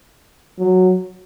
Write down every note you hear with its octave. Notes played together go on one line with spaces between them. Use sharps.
F#3